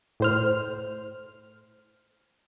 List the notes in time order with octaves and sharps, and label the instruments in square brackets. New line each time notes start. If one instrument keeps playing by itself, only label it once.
[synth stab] A2 C5 F6